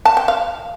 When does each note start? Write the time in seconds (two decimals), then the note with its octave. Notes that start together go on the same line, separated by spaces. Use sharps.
0.05 A5
0.17 G5
0.28 F5